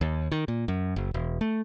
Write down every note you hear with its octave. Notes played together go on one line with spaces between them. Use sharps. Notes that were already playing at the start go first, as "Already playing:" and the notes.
D#2
D#3
A#2
F#2
F#1
E1
A3